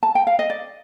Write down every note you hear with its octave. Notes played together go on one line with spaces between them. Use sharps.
A5
G5
F5
D#5
D5